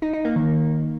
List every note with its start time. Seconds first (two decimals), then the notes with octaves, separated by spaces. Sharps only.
0.02 D#4
0.13 D#4
0.25 A#3
0.36 D#3